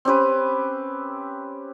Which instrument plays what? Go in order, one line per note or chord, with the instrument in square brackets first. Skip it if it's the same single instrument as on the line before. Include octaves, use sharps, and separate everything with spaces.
[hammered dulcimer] C4 C#4 G4 B4